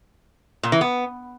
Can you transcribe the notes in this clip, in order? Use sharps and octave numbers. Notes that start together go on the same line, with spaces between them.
A#2
E3
B3